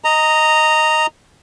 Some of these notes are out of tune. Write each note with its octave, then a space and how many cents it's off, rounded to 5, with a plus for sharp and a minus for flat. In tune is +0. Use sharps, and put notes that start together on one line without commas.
D#5 +0 A#5 -10